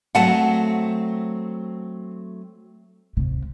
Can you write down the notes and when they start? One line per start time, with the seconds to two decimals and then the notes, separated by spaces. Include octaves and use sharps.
0.15 F#3 A3 C4 F#5 A5
3.17 C3